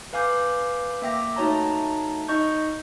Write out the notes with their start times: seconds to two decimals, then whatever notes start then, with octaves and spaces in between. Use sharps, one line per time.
0.13 B4 F5 G#5 D6 G6
1.02 A#3 E5 G5 D6 A#6
1.36 A3 D#4 F#4 C#5 A5 A#5
2.28 D#4 D#5 C#6 G6